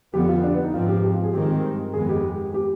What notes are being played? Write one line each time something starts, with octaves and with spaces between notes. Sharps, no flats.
F2 D3 F3 B3 G4
F4
D4
B3
D#4
G#2 F3 C4 F4
G4
G4
F4
G#4
G2 D#3 G#3 C4 G4
F2 D#3 G#3 B3 G#4
G4
G4